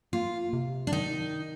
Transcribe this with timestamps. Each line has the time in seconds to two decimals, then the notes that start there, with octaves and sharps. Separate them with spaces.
0.13 A#3 F4
0.53 C3
0.87 D4
0.92 D#3 D#4